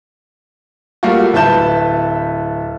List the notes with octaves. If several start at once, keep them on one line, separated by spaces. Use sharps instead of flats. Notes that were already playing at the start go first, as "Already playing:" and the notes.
G3 A3 A#3 F4 F#4
D1 B4 E5 A5 G6 E7